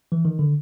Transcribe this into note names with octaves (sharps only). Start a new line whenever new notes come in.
E3
D#3
D3